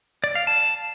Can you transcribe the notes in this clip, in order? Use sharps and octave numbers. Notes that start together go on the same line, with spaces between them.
D5
F5
A5